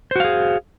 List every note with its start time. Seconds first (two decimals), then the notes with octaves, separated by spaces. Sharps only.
0.11 C5
0.16 F#4
0.20 F5
0.24 G#4